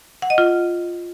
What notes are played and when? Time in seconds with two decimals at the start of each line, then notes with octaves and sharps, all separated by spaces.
0.22 F#5
0.30 D#5
0.38 F4